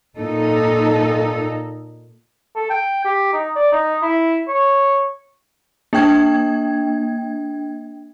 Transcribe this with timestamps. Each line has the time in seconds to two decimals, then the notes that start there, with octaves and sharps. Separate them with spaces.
0.19 A#2 D#4 A4
2.56 A4
2.70 G5
3.05 G4
3.33 D#4
3.56 D5
3.72 D#4
4.02 E4
4.48 C#5
5.93 A#3 D4 G5 G#6